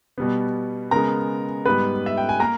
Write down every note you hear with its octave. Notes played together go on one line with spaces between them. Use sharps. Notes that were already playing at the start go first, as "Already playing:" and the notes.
B2 G3 B3
C#3 G#3 B3 A#4 A#5
G#2 G3 B3 B4 B5
E5
G5
G#5
A#3 A#4 A#5